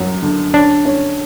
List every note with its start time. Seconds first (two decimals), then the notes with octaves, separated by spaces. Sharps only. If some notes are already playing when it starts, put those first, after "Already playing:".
Already playing: F#2 F#3
0.22 D3
0.54 C#4 D4
0.85 C#4